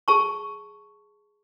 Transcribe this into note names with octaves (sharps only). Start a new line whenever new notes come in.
G#4 A5 C#6